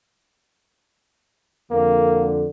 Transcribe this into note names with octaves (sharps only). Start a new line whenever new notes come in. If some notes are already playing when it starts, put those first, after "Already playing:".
F2 D3 A#3